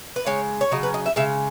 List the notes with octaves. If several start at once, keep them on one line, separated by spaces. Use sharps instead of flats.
B4
C#3 G#3 C#5
C#5
C#3 F#3 D#5
B4
D#5
E5
C#3 G#3 E5